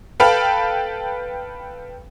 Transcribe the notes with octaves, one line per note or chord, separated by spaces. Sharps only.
A4 B4 F5 G5 B5 F6